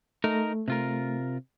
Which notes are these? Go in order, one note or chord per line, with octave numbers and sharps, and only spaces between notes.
A3 D#4 A#4
C3 F4 A#4